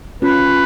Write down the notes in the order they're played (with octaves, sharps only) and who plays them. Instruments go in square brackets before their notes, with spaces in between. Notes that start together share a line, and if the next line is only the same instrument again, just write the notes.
[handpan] C#4 F4 [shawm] B4
[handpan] F4